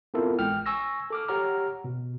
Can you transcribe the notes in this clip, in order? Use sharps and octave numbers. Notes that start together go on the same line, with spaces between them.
B3 C4 E4 F4 A4 A#4
A1 G#3 G5 F6
G#5 C#6 E6 A#6
A4 D6 F6
G4 C#5 F#5 A#5 F6
B2